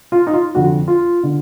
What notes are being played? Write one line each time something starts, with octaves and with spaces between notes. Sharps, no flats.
F4
D#4
F4
F2 D3 F#4
F4
D3